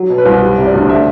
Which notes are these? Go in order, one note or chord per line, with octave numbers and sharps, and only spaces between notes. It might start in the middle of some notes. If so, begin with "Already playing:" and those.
Already playing: F#3
B2
B4
C2
G3
C3
D5
D2
A3 E5